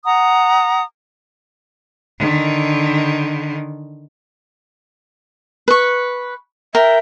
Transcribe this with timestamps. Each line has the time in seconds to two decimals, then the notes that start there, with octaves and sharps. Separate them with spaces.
0.05 F#5 A#5 D#6
2.19 D3 D#3
5.68 B4 C#6
6.75 A#4 E5 G5